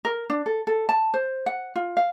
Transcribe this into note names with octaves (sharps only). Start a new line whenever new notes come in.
A#4
D4
A4
A4
A5
C5
F#5
F4
F5